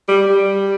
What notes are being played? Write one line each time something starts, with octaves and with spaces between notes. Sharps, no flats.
G3
G3